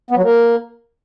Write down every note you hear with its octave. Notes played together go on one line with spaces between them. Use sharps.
B3
F#3
A#3